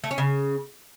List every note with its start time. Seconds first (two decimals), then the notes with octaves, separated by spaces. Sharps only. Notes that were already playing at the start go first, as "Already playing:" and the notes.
0.04 A3
0.11 C#4
0.18 C#3